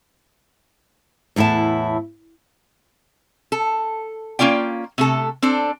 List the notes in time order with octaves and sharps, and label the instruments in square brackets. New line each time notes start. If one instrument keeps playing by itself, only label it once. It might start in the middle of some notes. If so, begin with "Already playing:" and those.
[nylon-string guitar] E2 A2 E4 F#5 A5
[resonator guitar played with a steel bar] A4
A#3 C#4 F4 D5 G5
C3 A3 A4
C4 D4 A4